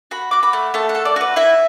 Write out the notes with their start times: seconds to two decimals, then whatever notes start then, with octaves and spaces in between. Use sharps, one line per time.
0.11 F#4 B5
0.31 F#4 D6
0.43 B5
0.53 A3
0.74 A3 A5
0.89 F#5
0.95 A4
1.05 D5
1.16 F#4 B4
1.36 E4 E5